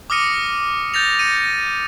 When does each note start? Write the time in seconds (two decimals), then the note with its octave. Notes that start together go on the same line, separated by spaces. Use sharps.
0.10 D6 D#6 F6 A#6 C#7 D#7
0.94 G6 A6 A#6 F7
1.19 A#6 C#7 D#7